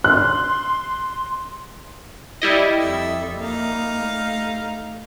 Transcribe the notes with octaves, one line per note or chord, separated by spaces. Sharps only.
C6 F#6
G3 E4 D#5
F2 A4 E5
A#3 D#4 F5
A3